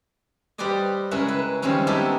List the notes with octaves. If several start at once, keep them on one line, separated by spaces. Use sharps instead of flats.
G3 G4 B4 C5 D5 D#5
C#3 G#3 C#4 E4 A#4 B4
B4
D#3 F3 G3 G#3 C4 C#4
G#3 B3 D#4 E4 G4 A4